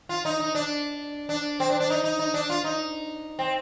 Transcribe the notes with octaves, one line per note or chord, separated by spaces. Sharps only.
F4
D#4
D#4
D4
D4
C4
D4
D4
D#4
D#4
D#4
D4
F4
D#4
C4